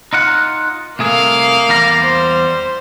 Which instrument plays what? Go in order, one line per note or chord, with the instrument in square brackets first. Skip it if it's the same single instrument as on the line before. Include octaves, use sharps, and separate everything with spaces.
[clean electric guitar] D#4 F4 F#5
[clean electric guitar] C2 A3 G#4 [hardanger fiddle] A#3 F5
[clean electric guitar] E2 G3 A#5
[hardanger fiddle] C5